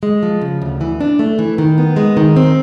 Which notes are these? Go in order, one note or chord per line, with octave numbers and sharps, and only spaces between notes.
G#3
F3
C#3
D2
E3
D4
A3
E3
D#3
B3
G#3
D#3
C4